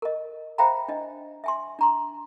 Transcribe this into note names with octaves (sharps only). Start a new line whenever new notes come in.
A#4 D#5
C5 E5 F5 G5 A#5 B5
D4 D#5
E5 G#5 C6
D4 A#5 C6